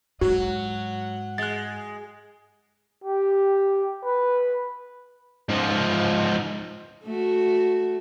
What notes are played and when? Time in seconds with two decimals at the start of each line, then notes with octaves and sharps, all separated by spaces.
0.21 G#2 F#3 F#4 F#5
1.38 G#3 F#6 A6
3.04 G4
4.04 B4
5.49 G#2 F3
7.04 A3 F#4